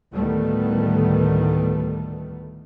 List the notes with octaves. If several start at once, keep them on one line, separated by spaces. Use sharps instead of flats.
D2 A2 D#3 G3 A3 B3